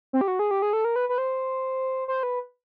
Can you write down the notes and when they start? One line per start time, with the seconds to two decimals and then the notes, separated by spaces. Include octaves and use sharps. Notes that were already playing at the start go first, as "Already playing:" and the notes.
0.13 C4
0.21 G4
0.28 F#4
0.39 G#4
0.51 G4
0.62 G#4
0.73 A4
0.85 A#4
0.96 B4
1.09 B4
1.18 C5
2.08 C5
2.23 B4